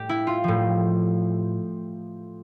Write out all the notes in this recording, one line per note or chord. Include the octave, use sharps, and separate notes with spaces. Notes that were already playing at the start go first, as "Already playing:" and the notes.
Already playing: A2 G3 G4
E4
F4
A2 F3